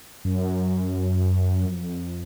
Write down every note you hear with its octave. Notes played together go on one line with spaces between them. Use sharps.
F#2
F2